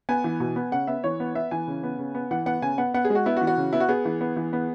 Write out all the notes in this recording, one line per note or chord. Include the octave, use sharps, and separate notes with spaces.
B3 G#5
E3
B2
B3
C#3 F#5
B3 E5
E3 C#5
B3
B3 E5
E3 G#5
C#3
B3
C#3
B3
E3 F#5
B3 F#5
C#3 G#5
B3 F#5
B3 F#5
G#4
G#3 F#4
B3 E4
F#4
E3
F#4
C#3
B3 E4
F#4
B3 G#4
E3
B3
E3
B3